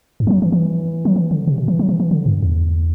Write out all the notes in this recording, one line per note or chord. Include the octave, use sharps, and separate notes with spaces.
G2
E3
F#3
E3
E3
F#3
E3
D3
C3
B2
E3
F#3
E3
E3
D3
G2
E2